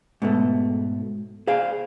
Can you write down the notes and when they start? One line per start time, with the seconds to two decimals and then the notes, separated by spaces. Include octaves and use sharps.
0.22 G#2 B2 A3
1.47 G#4 C5 F5